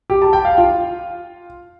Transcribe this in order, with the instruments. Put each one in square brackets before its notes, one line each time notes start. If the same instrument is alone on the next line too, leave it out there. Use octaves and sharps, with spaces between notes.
[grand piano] G4
A5
G5
F5
F4